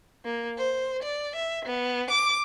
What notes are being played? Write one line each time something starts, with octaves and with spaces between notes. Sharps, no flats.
A#3
C5
D5
E5
B3
D6